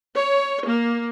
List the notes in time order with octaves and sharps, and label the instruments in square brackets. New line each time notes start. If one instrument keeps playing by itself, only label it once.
[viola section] C#5
A#3